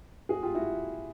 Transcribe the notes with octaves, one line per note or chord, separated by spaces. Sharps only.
F#4 G#4
F4 G4
E4 F#4